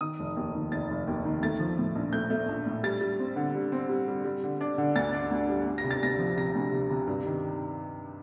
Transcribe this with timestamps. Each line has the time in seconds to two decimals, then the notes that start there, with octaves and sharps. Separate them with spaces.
0.01 D#3 D#6
0.19 F1
0.36 D#2
0.55 D#3
0.72 F1 A6
0.90 F1
1.07 D#2
1.25 D#3
1.42 A3 A6
1.60 F3
1.78 A2
1.95 A#1
2.13 A3 G6
2.30 A3
2.48 A#1
2.66 A2
2.83 G3 A6
3.01 G3
3.19 C4
3.36 D3
3.55 G3
3.72 C4
3.89 G3
4.08 G3
4.24 G3
4.43 D3
4.61 D4
4.78 D3
4.96 D2 A6
5.13 D4
5.31 D2
5.49 G3
5.66 D2
5.78 A#6
5.84 C3
5.91 A6
6.02 D2 A#6
6.19 F3
6.37 C3 A#6
6.55 D2
6.72 C3
6.90 C3
7.07 G2
7.25 D#3